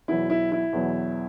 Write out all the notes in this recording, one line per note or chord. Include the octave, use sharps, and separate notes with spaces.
E2 B2 F#3 E4
E4
E4
E2 B2 F#3